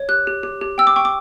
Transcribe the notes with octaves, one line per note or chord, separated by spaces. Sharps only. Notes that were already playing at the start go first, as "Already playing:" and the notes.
Already playing: C#5
G4 F#6
G4
G4
G4
G5 E6
D6
G5 C#6
D6